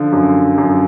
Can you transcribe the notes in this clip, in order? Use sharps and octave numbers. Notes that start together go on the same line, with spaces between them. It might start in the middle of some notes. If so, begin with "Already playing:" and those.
Already playing: D3 F3
F#2
F#2